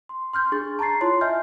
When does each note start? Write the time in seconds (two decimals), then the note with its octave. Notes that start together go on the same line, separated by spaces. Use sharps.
0.09 C6
0.33 C6 F6 G6
0.52 D4 G#4 C#6 A6
0.79 A5 A#5 C#6 A6 C7
1.00 E4 F4 C#5 A5 C6
1.21 D#5 E5 G#5 F6 G6